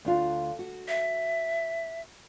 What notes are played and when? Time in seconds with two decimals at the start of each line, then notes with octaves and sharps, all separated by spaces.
0.05 D2 D4 F4
0.59 F#4
0.88 E5